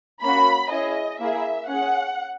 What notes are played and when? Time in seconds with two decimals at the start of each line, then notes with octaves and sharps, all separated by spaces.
0.22 A#3 C#4 F#4 B5
0.71 C#4 E4 G#4 D#5
1.19 A#3 E4 G#4 E5
1.68 C#4 G#4 F#5